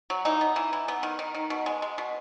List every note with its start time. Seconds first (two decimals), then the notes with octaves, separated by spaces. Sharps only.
0.10 F#3
0.25 E3 D#4
0.41 B3
0.56 E3
0.73 E3
0.88 B3
1.03 D#3
1.19 D#3
1.35 D#3
1.50 B2
1.66 G#3
1.82 G#3
1.98 B2